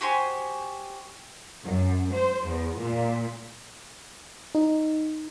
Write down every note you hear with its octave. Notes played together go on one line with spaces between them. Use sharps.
F#4 G4 C5 G#5
F#2
C5
E2
A#2
D#4